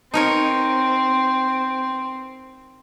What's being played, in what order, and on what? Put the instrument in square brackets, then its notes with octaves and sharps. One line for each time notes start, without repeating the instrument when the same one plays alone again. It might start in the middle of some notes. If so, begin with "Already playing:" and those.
[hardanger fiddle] C4 [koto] D#4 A#4 C#5